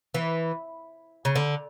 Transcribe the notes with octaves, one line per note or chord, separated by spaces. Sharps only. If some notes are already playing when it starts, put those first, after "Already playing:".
E3
C#3
D3